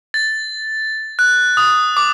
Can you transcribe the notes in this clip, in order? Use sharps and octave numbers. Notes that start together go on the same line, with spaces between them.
A6
F#6
D#6
D6